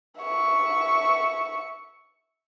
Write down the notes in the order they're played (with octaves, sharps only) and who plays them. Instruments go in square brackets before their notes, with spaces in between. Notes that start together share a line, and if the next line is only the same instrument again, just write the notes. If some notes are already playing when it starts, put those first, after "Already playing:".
[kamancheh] E5 C#6